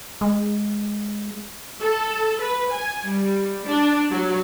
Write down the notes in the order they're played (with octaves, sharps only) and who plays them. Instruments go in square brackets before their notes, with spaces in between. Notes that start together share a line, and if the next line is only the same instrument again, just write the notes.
[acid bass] G#3
[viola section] A4
B4
G#5
G3
D4
F#3